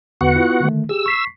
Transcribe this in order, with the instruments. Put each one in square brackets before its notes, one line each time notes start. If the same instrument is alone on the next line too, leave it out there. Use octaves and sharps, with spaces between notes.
[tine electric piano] E2 D3 [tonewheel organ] B3 F#4 F#5
[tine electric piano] E4 F4
D3 D#3 A3
[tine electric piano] G4 G#4 [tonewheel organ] E6
[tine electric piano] C#6 B6 C7